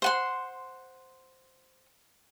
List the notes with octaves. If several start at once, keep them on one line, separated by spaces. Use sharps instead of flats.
C5 F#5 C6